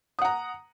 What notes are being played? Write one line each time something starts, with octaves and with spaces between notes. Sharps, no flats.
F#5 A#5 D#6